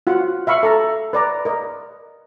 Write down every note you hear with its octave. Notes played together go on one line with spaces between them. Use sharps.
F4 F#4 F#5
E5 F5 B5 C#6
A4 A#5
B4 D5 A#5
A#4 D#5